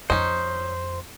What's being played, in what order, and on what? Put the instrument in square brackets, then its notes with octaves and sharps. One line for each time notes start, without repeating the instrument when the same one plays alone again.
[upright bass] F2 [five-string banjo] C#4 D#4 [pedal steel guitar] C5